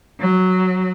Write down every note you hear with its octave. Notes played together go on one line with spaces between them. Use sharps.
F#3